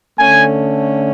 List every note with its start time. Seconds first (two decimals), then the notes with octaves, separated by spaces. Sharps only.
0.18 D3 A3 C#4 G#5